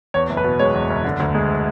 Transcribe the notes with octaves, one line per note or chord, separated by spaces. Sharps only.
E2 C#5
F#1
B4
B2
G#3 C#5
E2
F#1
D3
D2
G#3